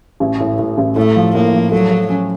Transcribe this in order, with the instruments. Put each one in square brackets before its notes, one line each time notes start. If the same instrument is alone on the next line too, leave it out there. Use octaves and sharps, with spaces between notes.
[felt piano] A1
A2
A2
A1
[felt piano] A2 [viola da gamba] A3
[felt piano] F3
[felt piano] A2 [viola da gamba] A#3
[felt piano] F3
[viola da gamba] F#3 [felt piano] A3
[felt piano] A3
C#4